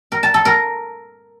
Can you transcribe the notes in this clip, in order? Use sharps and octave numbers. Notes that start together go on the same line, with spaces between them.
A#4
A5
A4
A#4